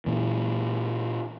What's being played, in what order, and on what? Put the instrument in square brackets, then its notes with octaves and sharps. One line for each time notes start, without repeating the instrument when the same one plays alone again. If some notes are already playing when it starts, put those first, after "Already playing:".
[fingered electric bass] A#2 E3